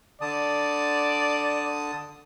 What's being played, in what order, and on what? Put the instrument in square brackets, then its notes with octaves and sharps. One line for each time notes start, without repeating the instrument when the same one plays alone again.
[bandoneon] D3 A5 D#6 [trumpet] D5